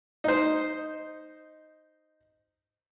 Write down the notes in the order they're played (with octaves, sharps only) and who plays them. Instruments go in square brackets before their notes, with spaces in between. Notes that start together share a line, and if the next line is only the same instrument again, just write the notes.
[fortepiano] D#4 C5